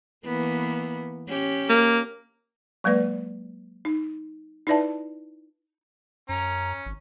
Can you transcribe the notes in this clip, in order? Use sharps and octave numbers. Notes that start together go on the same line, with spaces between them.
E3 A#3 B3
C#4 G4
A#3
F#3 G#3 A#3 B4 D5
D#4
D#4 E4 B4 D5 E5 A5
F#2 C#4 A#5
G#1